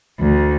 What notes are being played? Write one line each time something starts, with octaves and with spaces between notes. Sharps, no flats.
D2